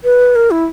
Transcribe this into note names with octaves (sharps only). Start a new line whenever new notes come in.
B4
A#4
E4